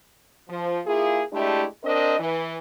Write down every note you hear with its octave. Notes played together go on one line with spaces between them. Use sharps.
F3
A#3 E4 F4 G#4
G#3 A3 D4 E4 G4
C4 D4 A#4 D#5
E3